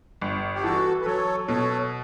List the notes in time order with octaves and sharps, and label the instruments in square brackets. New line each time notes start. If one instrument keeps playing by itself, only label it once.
[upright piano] G1
[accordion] G4
[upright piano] E3 [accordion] F#4 A4
[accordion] B4
[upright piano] F#3 [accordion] A4 C#5
[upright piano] B2 [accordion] A4 C#5